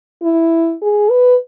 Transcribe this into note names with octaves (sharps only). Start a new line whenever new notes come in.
E4
G#4
B4